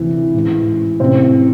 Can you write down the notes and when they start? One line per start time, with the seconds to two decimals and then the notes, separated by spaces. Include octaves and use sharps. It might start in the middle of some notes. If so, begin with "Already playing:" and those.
Already playing: D2 C3 E3 E4
0.33 A1 G#2 E3
1.00 A1 A2 C3 E3 C4